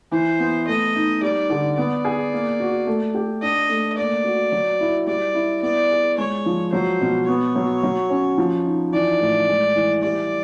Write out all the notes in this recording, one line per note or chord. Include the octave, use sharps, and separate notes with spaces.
E3 C5
B3
A3 D#5
D#4
G3 D5
D3
B3 D5
G#4
A#3
F#4
A3
G4
D4 D#5
A3
A#3 D5
F#4
F#3
E4
G3 D5
E4
B3 D5
G#4
G#3 C#5
F3
F#3 C5
B2
B3 C#5
F#3
F#3
C#4
F3
D#4
E3 D5
A2
G#3
E3
G3 D5